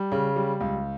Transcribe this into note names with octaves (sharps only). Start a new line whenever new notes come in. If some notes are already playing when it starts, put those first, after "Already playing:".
Already playing: G3
C#3
G3
C#2